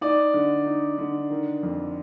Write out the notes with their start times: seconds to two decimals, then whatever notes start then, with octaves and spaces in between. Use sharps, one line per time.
0.01 D#4 D5
0.34 D3
0.66 D#4
0.98 D3
1.30 D#3
1.63 F2